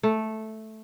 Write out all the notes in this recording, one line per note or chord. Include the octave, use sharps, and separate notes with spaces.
A3